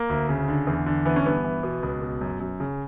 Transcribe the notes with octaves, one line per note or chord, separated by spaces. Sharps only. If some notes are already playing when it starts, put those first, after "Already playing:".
Already playing: A#3
D2
C#3
D3
E2
D3
E3 B3
C#4
G2 B3
E3
B2
C#2
B2
F#2
F#2
C#3